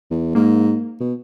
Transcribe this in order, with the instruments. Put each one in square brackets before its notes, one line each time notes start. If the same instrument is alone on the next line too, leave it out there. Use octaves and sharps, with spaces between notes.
[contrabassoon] E2
[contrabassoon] G#2 [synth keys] A#3
[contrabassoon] B2